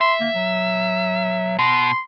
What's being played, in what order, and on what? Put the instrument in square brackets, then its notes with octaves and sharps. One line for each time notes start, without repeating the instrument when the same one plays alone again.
[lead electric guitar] E5 [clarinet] C6
[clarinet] A#3
F#3
[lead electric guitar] B2 [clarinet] C6